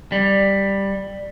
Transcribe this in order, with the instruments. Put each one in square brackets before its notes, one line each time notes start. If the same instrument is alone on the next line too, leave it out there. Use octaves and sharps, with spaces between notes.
[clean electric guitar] G3